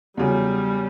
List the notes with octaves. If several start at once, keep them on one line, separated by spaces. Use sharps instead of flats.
E2 C#3 F#3 G3